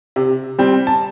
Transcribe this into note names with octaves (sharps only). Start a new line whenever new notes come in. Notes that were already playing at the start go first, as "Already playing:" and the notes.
C3
G3 C4
A5